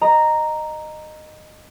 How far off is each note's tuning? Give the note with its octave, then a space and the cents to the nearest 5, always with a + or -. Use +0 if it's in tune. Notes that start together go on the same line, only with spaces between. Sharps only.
D#5 -15 A#5 +0